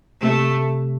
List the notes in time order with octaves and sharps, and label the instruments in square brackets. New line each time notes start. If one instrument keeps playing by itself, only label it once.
[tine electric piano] C3 [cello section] A3